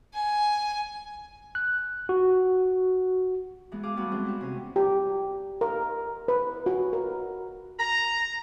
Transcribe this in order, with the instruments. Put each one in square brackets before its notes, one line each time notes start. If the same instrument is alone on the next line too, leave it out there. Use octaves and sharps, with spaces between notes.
[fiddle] G#5
[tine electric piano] F#6
F#4
[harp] E3 G#3 B3
G#4 F5 D6
G3 A3 B3 E4 F#4 G#4
E3 G#3 C4 D4
E4 F#4 G4
C3 C#4 G#5
[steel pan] G4
A#4
B4
F#4
A#4
[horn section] A#5